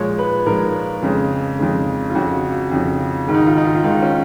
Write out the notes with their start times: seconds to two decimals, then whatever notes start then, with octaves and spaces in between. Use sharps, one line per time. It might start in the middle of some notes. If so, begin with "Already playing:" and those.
Already playing: A#2 F3 G#3 C#5
0.18 B4
0.46 A#2 F3 G#3 A#4
1.03 F2 C#3 G#3
1.59 F2 C#3 G#3
2.10 F4
2.15 F2 C#3 F3 F#4
2.71 F2 C#3 F3
3.27 G#2 D#3 G#3
3.34 D#4
3.46 F4
3.57 D#4
3.65 F4
3.75 F4
3.83 G#2 D#3 G#3 D#4
4.02 C#4